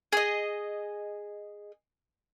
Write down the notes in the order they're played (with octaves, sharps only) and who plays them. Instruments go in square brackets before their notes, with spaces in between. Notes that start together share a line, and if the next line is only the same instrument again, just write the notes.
[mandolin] G#4 D#5